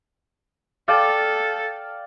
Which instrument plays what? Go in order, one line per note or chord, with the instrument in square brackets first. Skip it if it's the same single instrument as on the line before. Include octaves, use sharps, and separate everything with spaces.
[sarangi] A4 [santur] D5 F5 G5